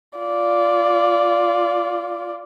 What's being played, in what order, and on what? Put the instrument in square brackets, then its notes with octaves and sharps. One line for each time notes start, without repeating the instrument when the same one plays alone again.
[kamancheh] F4 D5